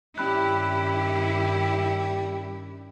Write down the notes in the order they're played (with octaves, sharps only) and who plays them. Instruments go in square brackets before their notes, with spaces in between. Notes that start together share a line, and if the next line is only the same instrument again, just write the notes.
[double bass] G2 D#3 [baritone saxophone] G3 [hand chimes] C#4 B5 F#6 [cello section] E4 G4